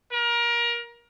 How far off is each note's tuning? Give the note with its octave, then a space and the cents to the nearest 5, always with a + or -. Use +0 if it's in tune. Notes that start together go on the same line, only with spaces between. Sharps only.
A#4 +25